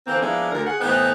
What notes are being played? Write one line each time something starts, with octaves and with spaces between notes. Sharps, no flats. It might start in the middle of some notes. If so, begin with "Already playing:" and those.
D3 E3 A#3 C4
F3 G#3 A#3 B3 D4 E4
D2 A#4
G#4 F#5
A2 E3 B3 C4 D#4